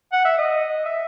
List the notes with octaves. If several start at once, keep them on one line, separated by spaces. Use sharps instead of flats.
F#5
E5
D#5
E5